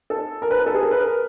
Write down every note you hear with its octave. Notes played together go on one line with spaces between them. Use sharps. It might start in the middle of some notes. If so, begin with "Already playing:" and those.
A4
A#4
B4
A#4
A4
G#4
A#4
B4
A#4